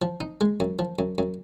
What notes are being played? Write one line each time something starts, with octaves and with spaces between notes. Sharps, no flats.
F3
D#4
G#3
F#2
F3
F#2
F#2